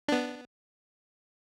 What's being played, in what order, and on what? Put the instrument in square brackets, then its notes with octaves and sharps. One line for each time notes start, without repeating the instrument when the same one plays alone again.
[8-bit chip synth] B3 D4